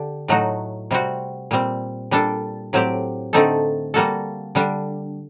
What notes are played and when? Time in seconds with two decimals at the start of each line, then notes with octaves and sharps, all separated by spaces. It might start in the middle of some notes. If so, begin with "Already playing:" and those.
Already playing: D3 D4 G4
0.28 A2 F#3 A3 D#4 F#4
0.91 C3 G3 C4 F#4
1.51 A#2 G3 C4
2.11 A#2 G3 D4 A4
2.73 A2 F#3 C4 G4
3.33 D3 A3 C4 D#4 A4
3.94 G3 A#3 F#4 A4
4.55 D3 G3 D4